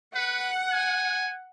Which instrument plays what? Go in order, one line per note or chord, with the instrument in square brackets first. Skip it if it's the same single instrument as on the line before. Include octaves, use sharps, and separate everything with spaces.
[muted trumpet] B4 [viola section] F#5
[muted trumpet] G#5